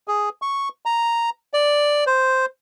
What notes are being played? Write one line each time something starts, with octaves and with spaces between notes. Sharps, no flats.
G#4
C#6
A#5
D5
C5